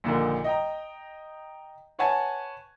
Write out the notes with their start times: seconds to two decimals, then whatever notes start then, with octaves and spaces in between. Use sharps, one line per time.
0.04 A#1 A#2 D3 D#3
0.44 D#5 G5 A#5
1.99 B4 C#5 F#5 G#5 A5 G#6